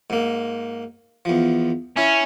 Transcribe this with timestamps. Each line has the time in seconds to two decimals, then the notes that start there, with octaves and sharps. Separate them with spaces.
0.10 G#2 A#3
1.25 E2 F3
1.97 C#4 E4